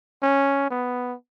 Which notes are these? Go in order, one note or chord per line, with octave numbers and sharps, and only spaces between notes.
C#4
B3